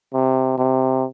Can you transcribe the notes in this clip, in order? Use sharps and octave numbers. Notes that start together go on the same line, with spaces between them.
C3
C3